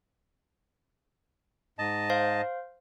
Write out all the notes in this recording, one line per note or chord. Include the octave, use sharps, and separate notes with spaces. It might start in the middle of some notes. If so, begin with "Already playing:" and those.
G#2 D#5 A5
C5 F5